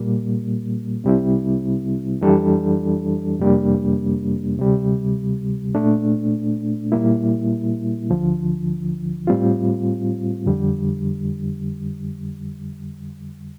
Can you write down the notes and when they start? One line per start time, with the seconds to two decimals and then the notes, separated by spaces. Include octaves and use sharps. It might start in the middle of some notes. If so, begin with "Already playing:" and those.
Already playing: A#2 G3 A#3
1.04 C2 C3 G3 C4 E4
2.21 F2 E3 G3 D4 A4
3.39 F2 C3 G3 A#3 D4
4.57 D2 C3 G3
5.75 A#2 A3 D4
6.92 A#2 G3 A#3 E4
8.10 D2 D3 F3
9.27 A2 G3 C4 F4
10.46 F2 D3 G3